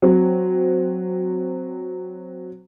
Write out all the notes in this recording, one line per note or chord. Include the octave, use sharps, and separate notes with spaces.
F#3 C4